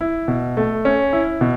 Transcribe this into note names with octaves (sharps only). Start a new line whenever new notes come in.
E4
B2
A3
C#4
E4
B2